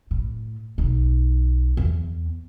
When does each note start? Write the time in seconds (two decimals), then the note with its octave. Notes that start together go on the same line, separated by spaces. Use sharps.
0.11 A2
0.78 B1 D#4
1.77 E2